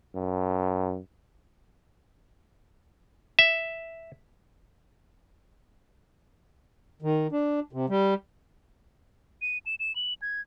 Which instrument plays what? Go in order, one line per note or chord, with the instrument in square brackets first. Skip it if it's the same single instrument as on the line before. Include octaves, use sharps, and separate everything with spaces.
[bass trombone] F#2
[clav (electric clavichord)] E5
[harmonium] D#3
D4
C3
G3
[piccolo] D#7
E7
E7
F#7
G#6